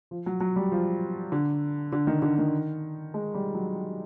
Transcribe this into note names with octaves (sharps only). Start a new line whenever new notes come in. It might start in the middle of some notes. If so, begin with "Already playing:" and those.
F3
F#3
F#3
G3
F3
D3
D3
D#3
D3
D#3
G#3
G3
F#3